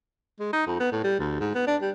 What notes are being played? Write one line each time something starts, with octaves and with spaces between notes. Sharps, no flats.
G#3
D#4
F2
B3
A2
G3
D2
G#2
B3
D4
G3